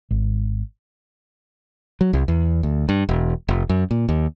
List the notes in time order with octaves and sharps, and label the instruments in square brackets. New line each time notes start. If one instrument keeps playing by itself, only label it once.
[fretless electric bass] G#1
[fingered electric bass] F#3
C2
E2
D2
G2
E1
F1
F#2
A#2
D#2